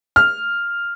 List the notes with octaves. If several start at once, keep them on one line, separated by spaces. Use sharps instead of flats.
F6